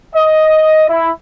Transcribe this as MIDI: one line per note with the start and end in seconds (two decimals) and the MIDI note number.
0.16 0.84 75
0.90 1.11 64